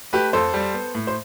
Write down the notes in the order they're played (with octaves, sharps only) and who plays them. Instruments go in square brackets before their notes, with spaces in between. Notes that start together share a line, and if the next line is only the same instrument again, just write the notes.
[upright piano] A3 G4 B4
F2 A4 C5
G3
B3
A2
C5